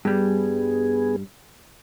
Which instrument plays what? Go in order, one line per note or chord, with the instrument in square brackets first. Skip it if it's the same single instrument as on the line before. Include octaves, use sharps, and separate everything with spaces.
[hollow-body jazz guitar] G2 G3 [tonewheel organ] B3 G#4